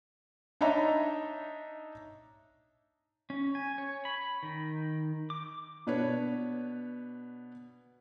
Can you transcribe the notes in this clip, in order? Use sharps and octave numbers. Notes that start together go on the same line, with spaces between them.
D4 D#4 C#5 D#5 E5 A#5
C#4
G#5
C#5
B5
D#3
D6
B2 D4 B4 C#5